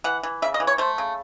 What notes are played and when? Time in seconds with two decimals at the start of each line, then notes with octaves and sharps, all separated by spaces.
0.04 E3 F#5
0.23 E3
0.42 C#3 E5
0.54 D#5
0.60 E3
0.67 C#5
0.78 A3 C5
0.98 C#3